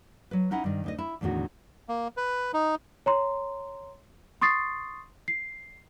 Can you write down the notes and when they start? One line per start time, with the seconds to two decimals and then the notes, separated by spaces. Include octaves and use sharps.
0.31 F#3 B4
0.51 C#4 D#4 E4 F#5
0.64 G2 D#3
0.84 D2 D#4 D#5
0.98 E4
1.21 E2 A2 D3 D#3 F#4
1.89 A#3
2.17 B4
2.54 D#4
3.06 C#5 A#5 C6
4.41 C6 C#6 D#6 A6 C7
5.28 C7